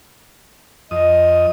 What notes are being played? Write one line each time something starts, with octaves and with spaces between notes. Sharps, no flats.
F2 D#5 D#6